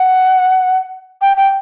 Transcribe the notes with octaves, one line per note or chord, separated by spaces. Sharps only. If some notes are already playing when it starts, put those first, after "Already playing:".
Already playing: F#5
G5
G5